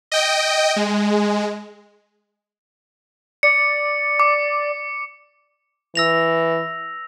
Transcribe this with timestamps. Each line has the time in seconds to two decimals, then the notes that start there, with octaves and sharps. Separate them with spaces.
0.12 D#5 G5
0.76 G#3
3.43 D5 C#7
4.20 D6
5.95 E3 E6 A#6 F7